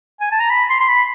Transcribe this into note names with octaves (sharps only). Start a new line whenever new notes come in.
G#5
A5
A#5
B5
C6
C6
B5